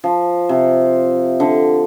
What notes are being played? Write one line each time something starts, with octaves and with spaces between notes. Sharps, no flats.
F3
C3
D3